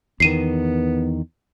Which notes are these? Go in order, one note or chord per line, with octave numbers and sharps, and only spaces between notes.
E2 D#3 B3 C7 D#7 E7